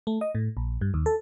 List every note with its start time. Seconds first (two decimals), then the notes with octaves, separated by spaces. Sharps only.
0.07 A3
0.21 D#5
0.35 A2
0.57 A#1
0.81 G2
0.94 D#2
1.06 A4